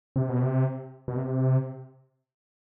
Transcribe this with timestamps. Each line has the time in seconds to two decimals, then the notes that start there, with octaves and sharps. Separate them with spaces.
0.16 C3
0.29 B2
0.42 C3
1.08 B2
1.16 C3